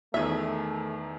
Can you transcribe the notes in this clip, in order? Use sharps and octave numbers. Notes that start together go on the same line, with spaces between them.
E2 D#3 A3 G#4 E5